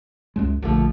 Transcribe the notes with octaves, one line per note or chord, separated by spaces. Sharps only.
C#2 F#2 G#3
A#1 D3 F3 A3